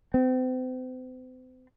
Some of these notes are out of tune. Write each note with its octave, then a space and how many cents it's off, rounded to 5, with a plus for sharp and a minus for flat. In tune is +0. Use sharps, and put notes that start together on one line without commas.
C4 -40